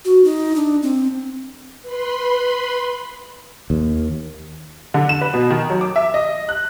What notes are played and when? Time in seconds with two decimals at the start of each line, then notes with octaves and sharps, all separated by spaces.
0.05 F#4
0.24 D#4
0.56 D4
0.83 C4
1.82 B4 B5 C6
3.70 D#2
4.94 D3
5.09 E7
5.21 B4
5.33 B2
5.50 D#3
5.70 F#3
5.81 D6
5.96 E5
6.14 D#5
6.49 F#6